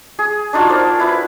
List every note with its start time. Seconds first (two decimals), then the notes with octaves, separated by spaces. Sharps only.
0.19 G#4
0.53 D4 D#4 F4 F#4
0.69 A#4 C5 D5
1.00 E4 B4